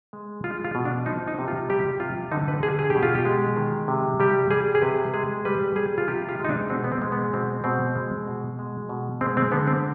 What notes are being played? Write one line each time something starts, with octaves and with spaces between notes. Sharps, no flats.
G#3
G#3 F4
F4
B2
D4
F3 D#4
D#4
C3
F4
G3 G4
C3 F4
D3 D#4
B4
D3 G#4
G#4
B2 G4
F4
G4
G#3
D#3
C3
G3 G4
G3 G#4
G#4
C3 B4
G#3 G#4
G3 B4
G3 G#4
F4
C3 G4
F4
G#3
D#4
D4
B2 C4
B3
C4
G#3
B3
B2 C4
B2 C4
G#3
B2
G#3
B2
G#3 C4
C4
D3 B3
C4